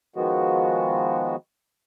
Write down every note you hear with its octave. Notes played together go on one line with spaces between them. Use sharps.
D#3 F3 G#3 B3 F#4